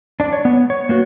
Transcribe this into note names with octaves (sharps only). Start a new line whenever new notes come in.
D4 D5
C#5
B3
C#5
A#3 B3 F#4